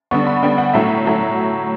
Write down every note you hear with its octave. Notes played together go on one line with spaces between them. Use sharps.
D3 G3 B3 C#6
B5
D3 G3 B3 G5
F#5
A2 F#3 A3 E5
A2 F#3 A3